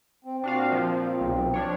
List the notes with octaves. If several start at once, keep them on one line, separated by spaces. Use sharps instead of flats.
C4
A#2 C4 D4 F#4 F5
F3
B1
F3 D4 C#5